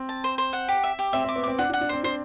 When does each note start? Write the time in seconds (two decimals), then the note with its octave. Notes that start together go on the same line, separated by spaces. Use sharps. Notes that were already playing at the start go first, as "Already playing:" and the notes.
Already playing: C4
0.09 A5
0.24 C5
0.38 C5
0.53 F#5
0.68 G4
0.83 E5
0.99 G4
1.13 C4 E5
1.24 C4
1.29 D6
1.36 B3
1.43 C4 D6
1.58 D4 F#5
1.69 D4
1.73 F#5
1.81 D4
1.89 C4 C5
2.03 D4 C5